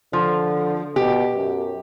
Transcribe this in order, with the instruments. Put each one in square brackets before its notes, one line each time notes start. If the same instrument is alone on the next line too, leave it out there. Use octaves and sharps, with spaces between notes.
[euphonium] D3 [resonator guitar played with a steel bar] F3
[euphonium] B2 [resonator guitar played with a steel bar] G4
[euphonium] F#2